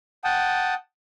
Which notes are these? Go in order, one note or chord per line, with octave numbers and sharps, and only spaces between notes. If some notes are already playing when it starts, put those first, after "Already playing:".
F#5 G5 A5 D#6